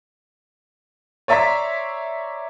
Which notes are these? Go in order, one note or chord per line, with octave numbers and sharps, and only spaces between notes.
C#5 D5 E5 A#5 C6 B6